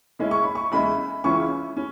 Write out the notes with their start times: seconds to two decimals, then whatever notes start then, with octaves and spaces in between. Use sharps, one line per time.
0.19 C#3 G#3 C#4 E4
0.31 C#6
0.43 B5
0.55 C#6
0.72 E2 C#3 G#3 E4 B5
1.24 C#2 C#3 E3 C#4 E4 C#6
1.77 C#4